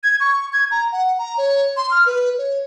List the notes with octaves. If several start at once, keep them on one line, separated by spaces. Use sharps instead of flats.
G#6
C#6
G#6
A#5
F#5
A#5
C#5
C6
F6
B4
C#5